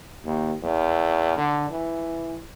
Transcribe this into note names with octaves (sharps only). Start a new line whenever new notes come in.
D#2
E2
D3
E3